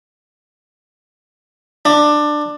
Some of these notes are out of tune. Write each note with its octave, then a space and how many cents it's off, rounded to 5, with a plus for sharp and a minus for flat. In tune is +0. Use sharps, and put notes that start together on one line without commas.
D4 +15